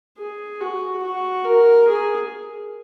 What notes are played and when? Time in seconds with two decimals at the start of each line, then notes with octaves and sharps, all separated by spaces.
0.17 G#4
0.60 F#4
1.02 F#4
1.45 A#4
1.87 G#4